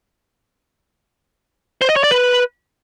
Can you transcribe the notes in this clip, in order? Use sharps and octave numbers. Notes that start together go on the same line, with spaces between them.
C5
D#5
C#5
D5
B4